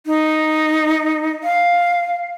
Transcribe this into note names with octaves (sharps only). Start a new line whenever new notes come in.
D#4
F5